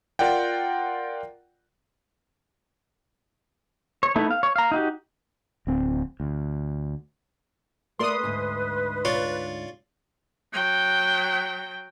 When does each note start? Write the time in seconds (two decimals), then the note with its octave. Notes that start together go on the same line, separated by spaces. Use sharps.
0.19 F4 A#4 D5 F#5 G5
4.03 C#5
4.16 A3 B3 D#4 E4
4.31 F5
4.43 C#5
4.56 F5 A#5
4.72 D#4 F#4 G4
5.67 D1 C4
6.20 D2
7.99 A3 A#4 B4 D5 C6 D#6
8.23 D2 G#2
9.05 F4 C#5 D5
10.53 F#3 G5